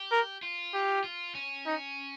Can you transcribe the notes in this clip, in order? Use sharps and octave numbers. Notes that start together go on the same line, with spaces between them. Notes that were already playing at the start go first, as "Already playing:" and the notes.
Already playing: G4
A#4
F4
G4
F4
C#4
D#4